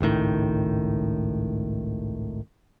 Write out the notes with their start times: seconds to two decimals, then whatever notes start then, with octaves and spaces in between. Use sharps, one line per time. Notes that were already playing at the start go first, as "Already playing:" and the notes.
0.01 G#1 C#2 A2 D#3